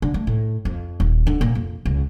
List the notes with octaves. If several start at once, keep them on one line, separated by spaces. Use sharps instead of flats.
D3
A3
A2
F2
D#1
D3
A#2
F2
C#2